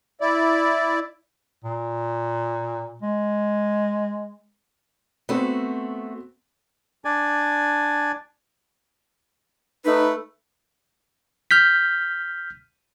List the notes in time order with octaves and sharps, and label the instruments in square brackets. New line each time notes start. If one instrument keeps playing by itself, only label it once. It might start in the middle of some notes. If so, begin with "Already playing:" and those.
[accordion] E4 D5
[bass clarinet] A#2
G#3
[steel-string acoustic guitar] A3 F#4 [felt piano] B3 C4
[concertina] D4 D5 G#5
[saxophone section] A3 B4 [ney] D#4
[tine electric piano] F6 G6 B6